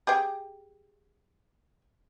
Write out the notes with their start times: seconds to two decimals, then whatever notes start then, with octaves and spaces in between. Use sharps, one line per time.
0.07 G4 G#4 G5